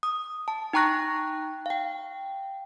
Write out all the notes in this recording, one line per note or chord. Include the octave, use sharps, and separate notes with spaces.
D#6
A5
D#4 G5 A#5 C#6 F#6 A#6
F5 G5